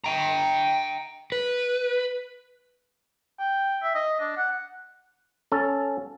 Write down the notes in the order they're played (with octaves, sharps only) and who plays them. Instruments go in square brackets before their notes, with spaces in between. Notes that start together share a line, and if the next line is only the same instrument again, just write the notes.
[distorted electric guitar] G5 A#5
[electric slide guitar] B4
[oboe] G5
E5
D#5
D4
F#5
[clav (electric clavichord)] C#4 A4